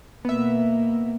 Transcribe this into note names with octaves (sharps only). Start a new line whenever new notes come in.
B2 A#3 B3 E5